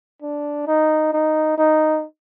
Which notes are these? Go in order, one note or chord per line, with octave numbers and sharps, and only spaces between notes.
D4
D#4
D#4
D#4